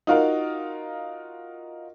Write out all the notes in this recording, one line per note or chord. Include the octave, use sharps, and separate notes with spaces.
D#4 F4 F#4 A#4 F5